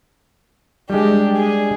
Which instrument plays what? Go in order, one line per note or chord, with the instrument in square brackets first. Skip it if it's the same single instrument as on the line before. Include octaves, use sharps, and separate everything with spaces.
[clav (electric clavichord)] G3 G#3 [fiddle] D4 G4
[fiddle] G#4